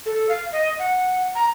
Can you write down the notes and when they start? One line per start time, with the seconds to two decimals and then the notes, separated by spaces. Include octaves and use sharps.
0.06 A4
0.29 F5
0.52 D#5
0.79 F#5
1.35 A#5